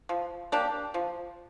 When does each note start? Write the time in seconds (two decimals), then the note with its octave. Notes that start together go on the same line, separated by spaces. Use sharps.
0.09 F3
0.52 A#3 D4 G4
0.94 F3